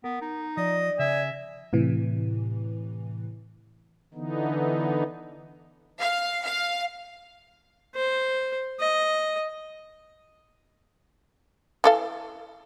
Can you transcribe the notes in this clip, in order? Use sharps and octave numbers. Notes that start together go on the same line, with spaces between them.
B3 A#4
D#4
F3 D5 D#5
C#3 E5 G#5
A2 C3 E3
D3 E3 B3 D#4
F5
F5
C5
D#5
E3 A4 F5